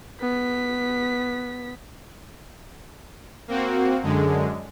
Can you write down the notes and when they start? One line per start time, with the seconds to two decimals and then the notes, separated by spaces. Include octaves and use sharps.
0.22 B3 B6
3.48 A#3 C4 F#4
4.03 F#2 D3 G#3